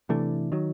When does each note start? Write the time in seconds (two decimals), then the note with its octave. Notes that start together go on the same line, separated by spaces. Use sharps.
0.09 C3 E3 A3 D4
0.52 D#3 F#3